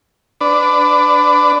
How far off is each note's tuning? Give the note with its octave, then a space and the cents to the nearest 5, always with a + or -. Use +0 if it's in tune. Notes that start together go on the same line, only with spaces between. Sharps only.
D4 +0 B4 +30